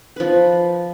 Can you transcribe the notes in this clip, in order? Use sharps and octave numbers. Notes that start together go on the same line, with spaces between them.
F3 B4